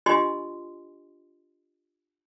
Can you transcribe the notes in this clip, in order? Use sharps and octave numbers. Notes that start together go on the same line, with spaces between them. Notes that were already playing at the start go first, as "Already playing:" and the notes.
D4 F4 G4 D#5 G#5 C6